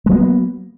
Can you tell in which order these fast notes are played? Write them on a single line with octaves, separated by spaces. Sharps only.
G#3 F#3 B3 A#3